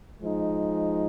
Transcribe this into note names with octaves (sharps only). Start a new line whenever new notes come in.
F3 G#3 D#4